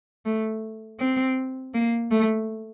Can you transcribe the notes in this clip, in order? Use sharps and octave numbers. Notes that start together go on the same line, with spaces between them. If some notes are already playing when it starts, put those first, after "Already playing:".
A3
C4
A#3
A3